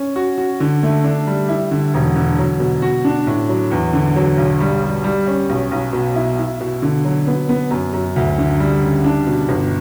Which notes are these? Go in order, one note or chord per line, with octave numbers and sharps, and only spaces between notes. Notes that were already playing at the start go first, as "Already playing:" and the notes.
Already playing: C#4
F#4
F#4
D3
A3
D4
G3
E4
D3
E1
D3
F#3
B2
F#4
D4
A2
F#3
E2
D3
F#3
B1
G3
G3
G3
C#4
B1
B1
B2
E4
E4
B2
D3
F#3
B3
B3
F#2
F#2
D2
D3
G3
C#3
D4
B2
G1